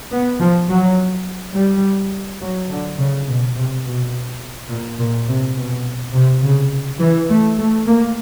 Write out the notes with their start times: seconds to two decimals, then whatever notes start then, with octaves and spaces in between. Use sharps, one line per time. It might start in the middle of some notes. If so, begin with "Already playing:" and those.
0.12 B3
0.40 F3
0.69 F#3
1.55 G3
2.41 F#3
2.69 D3
2.98 C#3
3.27 B2
3.56 C3
3.84 B2
4.71 A#2
4.99 A#2
5.28 C3
5.57 B2
6.14 C3
6.42 C#3
7.00 E3
7.29 A3
7.58 A3
7.86 A#3